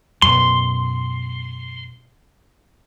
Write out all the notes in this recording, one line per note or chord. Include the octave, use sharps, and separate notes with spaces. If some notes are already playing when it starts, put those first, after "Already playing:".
F#2 B2 C6